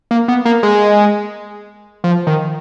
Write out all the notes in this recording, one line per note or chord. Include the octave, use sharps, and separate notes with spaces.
A#3
B3
A#3
G#3
F3
D#3